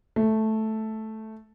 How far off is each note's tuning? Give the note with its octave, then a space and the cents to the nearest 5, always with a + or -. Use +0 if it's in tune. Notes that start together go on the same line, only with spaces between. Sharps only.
A3 -5